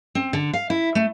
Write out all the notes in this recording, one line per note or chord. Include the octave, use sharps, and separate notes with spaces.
C4
D3
F5
E4
A3